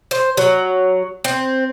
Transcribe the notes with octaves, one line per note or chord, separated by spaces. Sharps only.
C5
F#3
C4